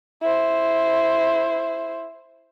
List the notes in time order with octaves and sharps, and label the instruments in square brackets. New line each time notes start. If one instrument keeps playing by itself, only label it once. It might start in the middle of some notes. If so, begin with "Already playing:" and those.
[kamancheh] E4 C5